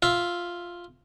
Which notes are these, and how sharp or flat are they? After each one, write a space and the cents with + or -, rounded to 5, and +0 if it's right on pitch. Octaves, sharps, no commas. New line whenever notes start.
F4 +0 E5 +0